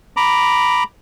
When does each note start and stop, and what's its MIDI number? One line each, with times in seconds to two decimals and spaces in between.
0.17 0.83 82
0.17 0.83 83
0.17 0.83 86